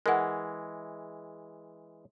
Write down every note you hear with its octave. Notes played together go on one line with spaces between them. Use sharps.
E3 G#3 A#4 F#5